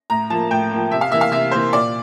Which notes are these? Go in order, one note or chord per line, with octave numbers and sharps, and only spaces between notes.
A2 A#5
F3 A#3 A5
A2 G5
F3 A#3
C3 E5
F5
E3 A#3 E5
F5
C3 E5
E3 A#3 C5
A#2 D5